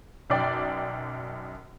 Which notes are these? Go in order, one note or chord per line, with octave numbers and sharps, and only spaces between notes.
B1 F#2 D5 G5